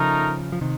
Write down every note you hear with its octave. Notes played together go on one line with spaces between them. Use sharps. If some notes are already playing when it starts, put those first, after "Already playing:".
Already playing: C#3 F3 A3 D#4 A#4
F3
C3 D#3